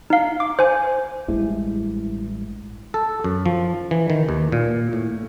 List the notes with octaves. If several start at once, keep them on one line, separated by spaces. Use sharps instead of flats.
D#4 F5
D6
C5 G#5
A1 G2 G#3 E4
A4
F#2
F3
E3
D#3
D#2
A#2
A2